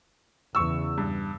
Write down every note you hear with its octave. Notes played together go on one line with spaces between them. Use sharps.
E2 C#3 C#6 E6
G2